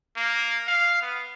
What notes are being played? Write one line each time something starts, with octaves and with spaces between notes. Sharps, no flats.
A#3
F5
B3